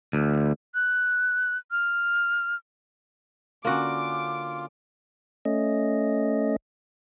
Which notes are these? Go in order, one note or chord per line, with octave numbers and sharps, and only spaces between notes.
D2
F#6
F6
D3 A#3 C#4 F4 F#4 D6
A3 C#4 D#5